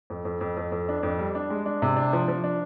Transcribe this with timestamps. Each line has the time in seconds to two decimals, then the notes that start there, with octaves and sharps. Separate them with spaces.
0.10 F2
0.25 F2
0.41 F2
0.57 F2
0.72 F2
0.88 D4
1.03 F2
1.19 G3
1.35 D4
1.50 G#3
1.66 D4
1.82 C3
1.97 D4
2.13 F3
2.28 F3
2.44 D4